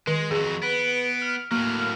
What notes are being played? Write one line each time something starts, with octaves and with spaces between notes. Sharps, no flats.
D#3 G#3
F2 F#3 G#4
B3 B4 D7
F6
A2 F#3 A#3 F6